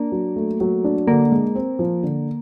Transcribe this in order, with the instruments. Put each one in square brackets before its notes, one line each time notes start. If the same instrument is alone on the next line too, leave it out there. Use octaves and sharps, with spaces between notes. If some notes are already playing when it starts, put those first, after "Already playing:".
Already playing: [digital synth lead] A#3 [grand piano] D4
[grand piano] F#3
A3
F#3
D4
[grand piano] D3 [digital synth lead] A#3
[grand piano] G#3
C4
F3
D3